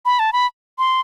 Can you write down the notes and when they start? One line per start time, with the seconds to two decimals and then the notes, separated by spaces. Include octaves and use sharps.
0.05 B5
0.19 A5
0.33 B5
0.78 C6